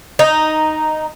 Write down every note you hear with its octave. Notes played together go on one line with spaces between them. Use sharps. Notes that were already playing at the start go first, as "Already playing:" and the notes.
D#4